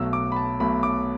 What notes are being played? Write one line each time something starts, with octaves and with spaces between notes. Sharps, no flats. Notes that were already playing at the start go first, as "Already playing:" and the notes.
Already playing: B1 B2 F#3 A3 E6
D6
B5
A5
B1 B2 F#3 A3 B5
D6